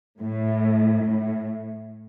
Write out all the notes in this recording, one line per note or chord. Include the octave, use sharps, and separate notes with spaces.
A2
A2